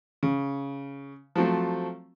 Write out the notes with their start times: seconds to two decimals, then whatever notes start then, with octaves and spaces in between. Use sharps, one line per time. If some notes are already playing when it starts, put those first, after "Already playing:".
0.23 C#3
1.36 F3 F#3 A3 C4